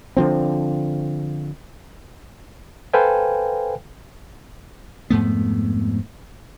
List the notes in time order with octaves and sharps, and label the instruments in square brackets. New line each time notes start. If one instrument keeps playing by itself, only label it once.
[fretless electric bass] D3 F3 C4
[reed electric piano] A4 B4 C5 F5 G5 G#5
[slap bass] F2 G#2 A3 B3